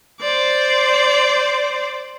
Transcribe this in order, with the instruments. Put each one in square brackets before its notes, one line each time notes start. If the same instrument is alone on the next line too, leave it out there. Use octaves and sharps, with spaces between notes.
[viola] C5 D5